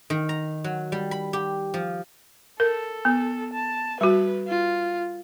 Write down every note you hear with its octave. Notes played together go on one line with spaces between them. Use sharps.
D#3
A#5
F#3
G3
B5
G4
F3
A4 A#4
B3
A5
G3 F#4 B4
F4